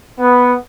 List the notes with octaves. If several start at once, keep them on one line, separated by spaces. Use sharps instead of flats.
B3